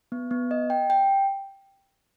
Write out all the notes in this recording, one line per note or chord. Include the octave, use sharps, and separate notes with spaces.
B3
B3
D#5
G5
G5